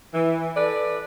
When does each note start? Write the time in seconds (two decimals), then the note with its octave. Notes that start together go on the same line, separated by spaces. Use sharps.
0.14 E3
0.56 A4 B4 D5